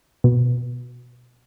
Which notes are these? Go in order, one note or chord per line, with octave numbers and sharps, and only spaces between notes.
B2